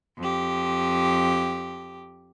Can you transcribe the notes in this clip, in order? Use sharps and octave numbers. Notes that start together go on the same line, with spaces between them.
F2 G4